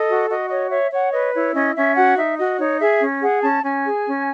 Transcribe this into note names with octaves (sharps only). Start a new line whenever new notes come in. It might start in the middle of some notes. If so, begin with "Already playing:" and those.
Already playing: A4 D#5
F#4
F#4 D#5
C#5 D#5
C#5 E5
C#5 F#5
B4 D#5
E4 C#5
C#4 D#5
C#4 E5
F#4 F#5
D#4 E5
F#4 D#5
D#4 C#5
G#4 E5
C#4
G#4 F#5
C#4 A5
C#4 G#5
G#4
C#4